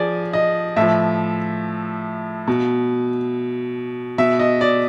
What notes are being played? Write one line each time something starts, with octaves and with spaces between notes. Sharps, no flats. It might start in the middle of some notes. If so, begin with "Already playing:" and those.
Already playing: F3 G#4 D5
D#5
A2 F3 E5
B2
B2 E5
D#5
D5